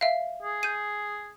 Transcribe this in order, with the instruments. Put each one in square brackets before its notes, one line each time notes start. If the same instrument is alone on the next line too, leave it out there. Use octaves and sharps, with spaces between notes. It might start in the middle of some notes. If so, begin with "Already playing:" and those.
[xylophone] E5 F5
[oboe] G#4
[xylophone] G6 D#7